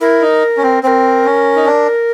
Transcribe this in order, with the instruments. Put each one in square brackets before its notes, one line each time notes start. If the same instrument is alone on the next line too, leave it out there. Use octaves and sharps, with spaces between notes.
[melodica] E4 [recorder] A#4
[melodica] D#4
C#4
C4
[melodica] C4 [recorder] C5
[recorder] A#4
[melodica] C#4
D#4
D4